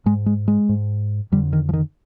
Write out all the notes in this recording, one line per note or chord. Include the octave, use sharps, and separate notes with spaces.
G#2 G#3
G#3
G#3
G#2
F2 D3 G3
D#3
F3
D#3